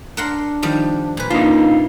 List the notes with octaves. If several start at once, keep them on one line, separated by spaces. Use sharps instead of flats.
D4 A#4 F#5 C6
D#3 F3 G3
A#2 B4
A#3 D4 D#4 F4